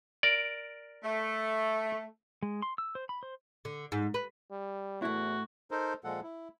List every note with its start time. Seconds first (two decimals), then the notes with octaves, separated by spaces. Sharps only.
0.23 A#4 D5
1.03 A3
2.43 G#3
2.62 C6
2.78 E6
2.95 C5
3.09 B5
3.23 C5
3.65 D3
3.92 G#2
4.14 B4
4.51 G3
5.02 E2 A2 E4 F#4
5.71 D#4 A4 A#4 C5
6.04 A#2 F3 G#3 A4 F#5
6.23 E4